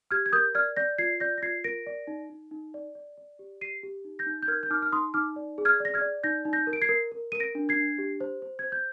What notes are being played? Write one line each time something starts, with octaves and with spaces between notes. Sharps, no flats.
G4 F6 G#6
G#6
A#4 D#6 G6
D5 F6 G#6
D5 G6 A#6
F4 G#6 C7
D5 G6 A#6
A#6
F4 G#6 C7
A#4 A#6 D7
D5
D#4
D#4
D#4
D5
D5
D5
G4
G4 C7 D#7
G4
D#4
G6 A#6
D#4
G6
A#4 F6 G#6
G6
D#4 D6 F6
F6
D#4 C6 D#6
D#4 D6 F6
D5
G#4
F6 G#6
D5 A#6
F6 G#6
D5
D#4 G6 A#6
D#4
G6 A#6
A#4
D7
G#6 C7
A#4
A#4
A#4 D#7
A#6 D7
D4
G#6 C7
D4
G4
C5
C5
C5 G#6
G6